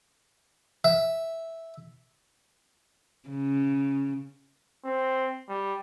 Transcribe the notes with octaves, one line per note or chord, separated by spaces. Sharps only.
E5
C#3
C4
G3